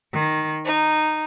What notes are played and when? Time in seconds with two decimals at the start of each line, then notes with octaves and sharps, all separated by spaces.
0.15 D#3
0.65 D#4